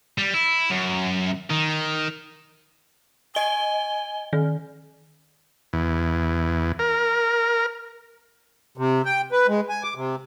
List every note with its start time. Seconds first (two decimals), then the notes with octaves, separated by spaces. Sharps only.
0.18 G3
0.34 E4
0.70 F#2
1.51 D#3
3.35 D#5 G#5 G7
4.33 D#3
5.73 E2
6.79 A#4
8.78 C3
9.05 G5
9.32 B4
9.48 G#3
9.69 G#5
9.83 D6
9.96 C3